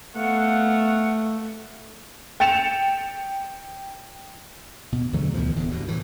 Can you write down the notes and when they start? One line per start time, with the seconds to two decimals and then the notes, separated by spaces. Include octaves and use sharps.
0.15 A3 B3 F5 F#5
2.40 G5 A6 C#7 E7 F7
4.92 B2
5.12 E2 D3 F#3 A3
5.34 D2 B2 E3 F3
5.54 D1 E2 D3
5.71 G2 B2
5.88 A2 E3